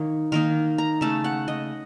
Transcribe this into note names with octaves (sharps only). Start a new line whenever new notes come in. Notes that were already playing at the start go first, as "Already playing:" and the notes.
Already playing: D#3 A#3 D#4 C#5
D#3 A#3 D#4 A#4
A#5
C#3 A3 C#4 A5
F#5
D#5